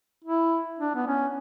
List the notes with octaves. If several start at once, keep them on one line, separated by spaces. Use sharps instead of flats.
E4
D4
B3
C#4